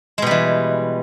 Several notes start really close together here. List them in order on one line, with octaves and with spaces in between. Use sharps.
G#3 B2 G3 E3